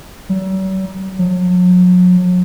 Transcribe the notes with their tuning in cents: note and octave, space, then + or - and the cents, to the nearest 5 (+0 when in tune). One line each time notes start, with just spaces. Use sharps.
F#3 +45
F#3 -40